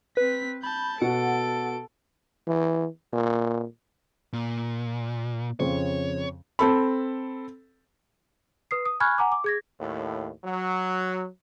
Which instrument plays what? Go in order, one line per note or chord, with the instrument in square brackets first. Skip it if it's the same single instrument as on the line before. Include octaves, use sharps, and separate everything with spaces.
[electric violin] C4 B6 [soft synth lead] B4
[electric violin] A5 G6 [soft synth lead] B5
[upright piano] B2 [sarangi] A4 [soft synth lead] F#5 [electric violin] D7
[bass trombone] E3
A#2
[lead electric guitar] A#2
[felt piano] F2 C#3 C5 [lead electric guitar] C#5
[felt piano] C4 A4 B5
[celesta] B4 D#6 C7
D#6
G#5 B5 C#6 F6 F#6 G#6
F#5 G#5 A#5 D6
D6
G#4 G#6 A#6
[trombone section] D#2 A2
F#3